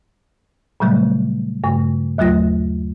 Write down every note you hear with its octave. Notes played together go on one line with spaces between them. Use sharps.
A#2 C#3 F#3 G3 A3
G2 C#3 A3
D#2 F#3 A3 F4 A#6